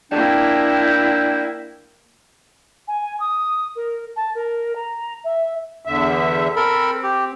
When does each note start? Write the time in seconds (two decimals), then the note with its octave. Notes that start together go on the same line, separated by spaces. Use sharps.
0.11 A#3 D4 E4 G5
2.88 G#5
3.20 D#6
3.76 A#4
4.16 A5
4.35 A#4
4.75 A#5
5.24 E5
5.85 E2 D3 E5
6.56 C4 A4 A#4 B5
7.03 G4